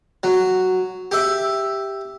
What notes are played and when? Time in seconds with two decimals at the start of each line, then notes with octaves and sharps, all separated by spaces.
0.23 F#3
1.11 G4 E5